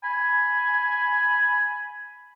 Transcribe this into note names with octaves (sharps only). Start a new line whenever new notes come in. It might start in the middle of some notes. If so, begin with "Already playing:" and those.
G#5 B5